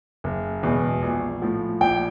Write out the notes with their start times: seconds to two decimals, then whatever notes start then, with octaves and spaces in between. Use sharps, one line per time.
0.24 F#1
0.63 E2 B2 G#3
1.02 A#1
1.42 A2 F3
1.81 A#1 G5